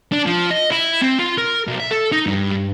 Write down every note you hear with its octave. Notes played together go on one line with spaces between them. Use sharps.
D4
F3
D#5
E4
C4
F4
A#4
B1
E5
A4
D#4
G2